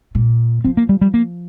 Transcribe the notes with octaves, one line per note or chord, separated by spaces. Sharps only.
A#2
F3 C4
A#3
G3
G3
A#3